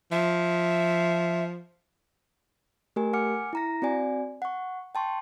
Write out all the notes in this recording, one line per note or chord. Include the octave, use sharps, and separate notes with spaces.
F3 E5
A3 G4 A#4 G#5
F#5 G#5 D6 F6 C#7
E4 A#5 A#6
C4 F#4 D5 G#5
F#5 C#6
G5 A5 C6 C#6